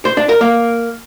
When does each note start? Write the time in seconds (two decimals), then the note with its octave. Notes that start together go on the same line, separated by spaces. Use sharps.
0.05 C5
0.17 D4
0.29 A#4
0.41 A#3